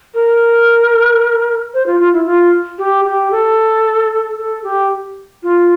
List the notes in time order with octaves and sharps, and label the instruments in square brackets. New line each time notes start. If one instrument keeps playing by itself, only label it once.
[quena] A#4
C5
F4
F4
E4
F4
G4
G4
A4
A4
G4
F4